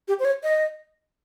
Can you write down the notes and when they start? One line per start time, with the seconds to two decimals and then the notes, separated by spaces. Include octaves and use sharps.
0.08 G4
0.19 C5
0.25 C#5
0.43 D#5